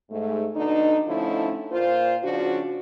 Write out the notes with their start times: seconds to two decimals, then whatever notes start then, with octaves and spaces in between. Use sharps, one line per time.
0.11 G#2 A3
0.56 B2 D3 D4 D#4
1.08 D3 F3 A3 C#4 D#4 E4
1.71 A#2 F4 C5
2.23 C#3 F3 D4 F#4